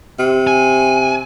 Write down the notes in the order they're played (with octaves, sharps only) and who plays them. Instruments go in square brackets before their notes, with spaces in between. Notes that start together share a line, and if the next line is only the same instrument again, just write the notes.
[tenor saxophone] C3
[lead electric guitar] G#5